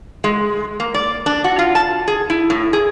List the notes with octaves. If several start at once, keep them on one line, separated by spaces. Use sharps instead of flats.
G#3
A#3
D5
D4
F#4
F4
A5
G#4
E4
A2
G#4